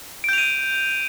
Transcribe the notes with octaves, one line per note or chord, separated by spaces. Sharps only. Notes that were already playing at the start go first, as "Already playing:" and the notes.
G6 D7 D#7 F7